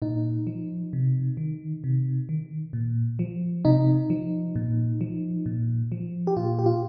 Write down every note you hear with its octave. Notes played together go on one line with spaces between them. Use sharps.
A#2 D#4
F3
C3
D#3
C3
D#3
A#2
F3
C3 D#4
F3
A#2
F3
A#2
F3
G4
A#2 F4
G4
F4